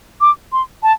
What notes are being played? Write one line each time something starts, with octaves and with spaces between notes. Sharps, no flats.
D6
C6
A5